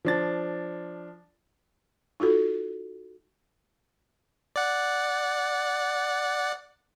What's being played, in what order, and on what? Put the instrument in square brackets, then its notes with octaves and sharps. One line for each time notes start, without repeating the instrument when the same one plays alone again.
[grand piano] F3 D4 A6
[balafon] D#4 F4 F#4 A4
[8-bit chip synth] D5 F#5